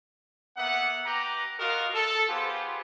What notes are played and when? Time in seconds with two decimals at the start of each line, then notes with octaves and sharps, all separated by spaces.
0.57 A#3 B3 E5 F#5
1.05 G4 B4 A#5
1.58 F4 F#4 A#4 D#5 F5
1.93 A4
2.28 B3 F4 G4 G#4 C5